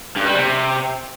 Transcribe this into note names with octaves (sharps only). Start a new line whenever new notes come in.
G2
G3
C3